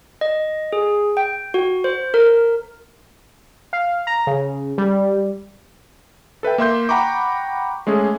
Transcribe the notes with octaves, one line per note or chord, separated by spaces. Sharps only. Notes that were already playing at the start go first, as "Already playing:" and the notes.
D#5
G#4
G5
F#4
C5
A#4
F5
A#5
C#3
G3
A4 B4 E5 G5
A#3 E5 C6 G6
F#5 G5 A#5 B5 C#6 D6
G#3 A3 C#4 G#4